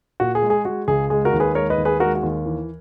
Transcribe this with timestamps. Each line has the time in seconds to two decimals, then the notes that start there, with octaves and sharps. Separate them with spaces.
0.20 A#2 F#4
0.35 G#4
0.43 G#3
0.50 G#4
0.65 G#3 F#4
0.88 C#2 G#4
1.10 G#3 G#4
1.25 F#4 A#4
1.33 D#2
1.40 G#4 B4
1.55 G#3 A#4 C#5
1.70 B4 D#5
1.78 D#2
1.85 G#4 B4
2.00 G#3 F#4 A#4
2.15 F#4
2.23 D#2
2.46 E3